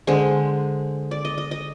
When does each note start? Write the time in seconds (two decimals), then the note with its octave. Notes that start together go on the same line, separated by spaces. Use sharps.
0.07 D3 G#3 C5
1.11 D5
1.25 D#5
1.38 D#5
1.51 D#5